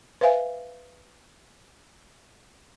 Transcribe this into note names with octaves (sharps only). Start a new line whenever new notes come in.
B4 C5 E5 F5 G#5